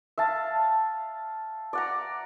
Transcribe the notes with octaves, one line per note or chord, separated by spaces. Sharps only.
E5 F5 A5
D5 F#5 A#5